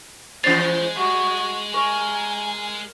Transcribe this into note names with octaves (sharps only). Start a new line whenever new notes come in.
E3 G#3 C#4 C5 A6 C7 F7
G3 F#4
A#4 G#5 C#6